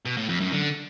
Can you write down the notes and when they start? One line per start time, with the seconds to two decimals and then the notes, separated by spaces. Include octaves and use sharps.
0.05 B2
0.17 A2
0.29 F2
0.41 F#2
0.52 D3